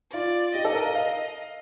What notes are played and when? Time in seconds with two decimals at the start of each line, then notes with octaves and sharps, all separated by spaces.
0.13 F4 D5
0.54 G4 D#5
0.65 A4
0.75 A#4
0.85 F5
0.95 F5